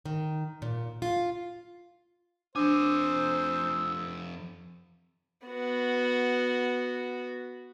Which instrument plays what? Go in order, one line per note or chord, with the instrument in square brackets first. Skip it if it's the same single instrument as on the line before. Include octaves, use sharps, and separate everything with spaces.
[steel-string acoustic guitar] D#3
A#2
F4
[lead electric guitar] F2 G#5 [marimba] D4 [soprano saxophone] C5 [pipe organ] D#6 E6
[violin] B3 F#4